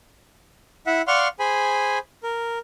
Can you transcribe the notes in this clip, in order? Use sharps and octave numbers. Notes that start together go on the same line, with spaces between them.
E4 E5 F#5
D5 F5 F#5 C6 C#6 F6
G#4 C5 G#5 B5
A#4